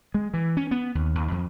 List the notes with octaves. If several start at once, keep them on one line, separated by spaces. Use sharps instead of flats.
G#3
E3
C#4
B3
D#2
D#2
F2